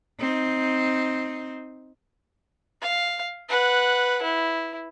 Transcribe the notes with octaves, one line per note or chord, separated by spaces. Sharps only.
C4 D#4
F5
B4 F#5
E4